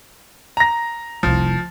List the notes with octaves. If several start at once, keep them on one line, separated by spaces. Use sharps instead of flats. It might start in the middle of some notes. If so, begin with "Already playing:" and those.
A#5 A#6
F1 C2 F3